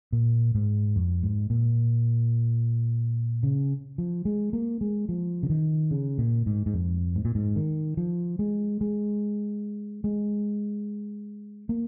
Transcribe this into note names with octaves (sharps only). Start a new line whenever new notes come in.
A#2
G#2
F2
G#2
A#2
C#3
F3
G#3
A#3
G#3
F3
C#3
D#3
C#3
A#2
G#2
G#2
F2
G#2
A#2
G#2
D#3
F3
G#3
G#3
G#3
A#3